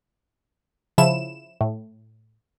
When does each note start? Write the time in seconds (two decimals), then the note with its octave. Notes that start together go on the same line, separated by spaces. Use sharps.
0.98 C#3 F3 E4 E7
1.61 A2